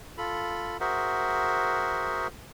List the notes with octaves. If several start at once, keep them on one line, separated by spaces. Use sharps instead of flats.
F4 A4 B5
F#4 G#4 A#4 C5 E5 F#5